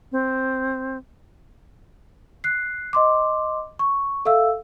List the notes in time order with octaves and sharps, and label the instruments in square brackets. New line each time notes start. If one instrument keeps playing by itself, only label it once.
[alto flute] C4
[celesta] F#6 C7
D#5 C6 D6
C#6
A4 E5 F5 E6